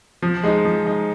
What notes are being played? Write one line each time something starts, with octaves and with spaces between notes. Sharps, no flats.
F3
G#3 D#4
F3
G#3 D#4